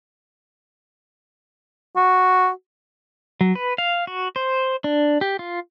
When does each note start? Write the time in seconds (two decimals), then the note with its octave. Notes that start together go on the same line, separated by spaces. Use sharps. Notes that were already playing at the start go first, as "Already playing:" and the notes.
1.96 F#4
3.41 F#3
3.55 B4
3.78 F5
4.07 F#4
4.36 C5
4.84 D4
5.21 G4
5.39 F4